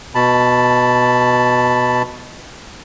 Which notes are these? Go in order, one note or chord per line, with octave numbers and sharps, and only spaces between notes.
B2 A5 B5